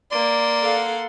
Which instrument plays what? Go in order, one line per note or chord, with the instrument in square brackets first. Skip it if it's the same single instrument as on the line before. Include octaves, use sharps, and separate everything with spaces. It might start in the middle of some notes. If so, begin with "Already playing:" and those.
[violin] A#3 C6 [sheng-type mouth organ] D5
[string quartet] A4 F5 F#5